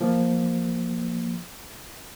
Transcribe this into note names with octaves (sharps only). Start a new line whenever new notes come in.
F3 A#3